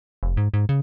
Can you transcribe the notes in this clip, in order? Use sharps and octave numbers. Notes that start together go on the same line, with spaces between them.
F1
G#2
G#2
C#3